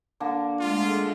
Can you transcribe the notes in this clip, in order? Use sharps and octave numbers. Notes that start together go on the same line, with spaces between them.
D3 A#3 A5
G#3 A3 F4